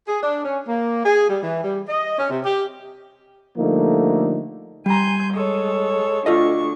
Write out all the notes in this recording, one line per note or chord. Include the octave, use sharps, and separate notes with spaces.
G#4
D4
C#4
A#3
G#4
G3
E3
G3
D#5
C#4
C3
G4
D3 F3 G3 A3 A#3 D#4
G3 G#5 A#5 C6 G6
G#3 A4 C#5
D2 D4 F4 A4 D#5 C#6